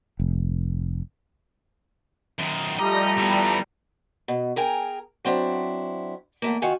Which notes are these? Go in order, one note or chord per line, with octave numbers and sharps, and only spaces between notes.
F1
F#2 D#3
F3 G3 A3 D#5 A#5
E3 B3
B2
G#4 A#4 G5 G#5 A#5
F#3 C4 D4 E4
E2 A3 A#3
D#3 F4 F#4 F5 G#5